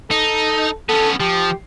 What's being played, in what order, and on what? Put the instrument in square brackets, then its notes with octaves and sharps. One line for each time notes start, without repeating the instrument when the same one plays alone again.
[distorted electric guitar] D#4 [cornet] A4
[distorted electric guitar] B3 C#4 [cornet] A4
[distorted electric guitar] F3 [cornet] G4